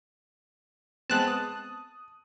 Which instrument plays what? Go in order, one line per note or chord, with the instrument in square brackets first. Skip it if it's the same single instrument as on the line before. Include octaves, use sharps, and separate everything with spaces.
[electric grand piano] G#3 B3 C4 [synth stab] A5 F#6
[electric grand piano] D#6